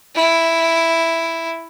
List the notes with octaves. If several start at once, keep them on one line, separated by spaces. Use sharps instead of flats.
E4